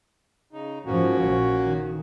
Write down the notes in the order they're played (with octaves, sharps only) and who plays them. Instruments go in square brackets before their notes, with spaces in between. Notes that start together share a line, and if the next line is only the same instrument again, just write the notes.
[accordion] C#3 D#4
[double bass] G#2 F3 [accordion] A#3 C#4 F#4
[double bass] A#1
D#3